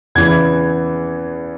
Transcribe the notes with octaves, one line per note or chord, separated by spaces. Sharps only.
E2 C#3 E3 G#6